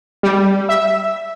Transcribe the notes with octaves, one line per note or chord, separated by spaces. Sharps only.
G3
E5